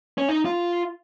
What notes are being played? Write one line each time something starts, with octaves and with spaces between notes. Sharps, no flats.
C#4
D#4
F4